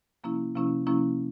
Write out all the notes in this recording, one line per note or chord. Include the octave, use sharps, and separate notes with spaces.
C3 F3 A#3 C#4 E4
C3 F3 A#3 C#4 E4
C3 F3 A#3 C#4 E4